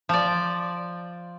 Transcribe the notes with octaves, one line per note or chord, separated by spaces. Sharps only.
F3 D5